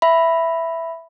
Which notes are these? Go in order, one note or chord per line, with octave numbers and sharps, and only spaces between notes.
E5 B5